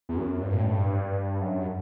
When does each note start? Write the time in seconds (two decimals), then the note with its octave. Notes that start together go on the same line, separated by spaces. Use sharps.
0.09 E2
0.17 F#2
0.42 G2
0.54 A2
0.65 G2
1.41 F#2